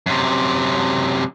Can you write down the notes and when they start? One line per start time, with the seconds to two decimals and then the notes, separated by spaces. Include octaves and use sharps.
0.06 F#2 C3